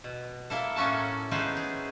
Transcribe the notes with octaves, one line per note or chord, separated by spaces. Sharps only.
B2
A#3 E4 A4
A2 A#3 C#4 F#4 A5
B3 C#4 D#4 E4 G#4 C5
G#4